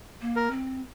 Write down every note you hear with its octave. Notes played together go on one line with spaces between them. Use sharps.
A#3
A#4
C4